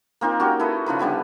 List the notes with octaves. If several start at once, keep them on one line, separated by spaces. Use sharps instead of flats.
A#3 C4 D#4 F4
C#4 F#4 G4 A#4
E4 A4 B4 D#5
C#3 F3 D#4 B4
D3 G3 B3 E4